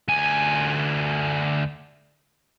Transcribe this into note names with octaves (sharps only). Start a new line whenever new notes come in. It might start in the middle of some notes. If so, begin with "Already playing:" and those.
D2 G#5